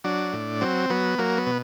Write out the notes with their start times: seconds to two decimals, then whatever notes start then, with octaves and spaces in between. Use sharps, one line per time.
0.04 F#3 D4
0.33 A2
0.61 F#3 C4
0.90 F#3 B3
1.19 F#3 A#3
1.38 B3
1.47 B2